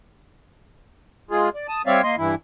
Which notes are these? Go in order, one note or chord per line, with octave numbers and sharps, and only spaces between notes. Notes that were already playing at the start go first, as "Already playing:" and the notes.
G#3 F4 G#4
D5
A5 D#6
G3 C4 C#5 D5 E5 F5
A#3 D#5 C6
G2 E3 E4